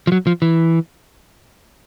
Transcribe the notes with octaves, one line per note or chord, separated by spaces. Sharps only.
F3
F#3
F3
E3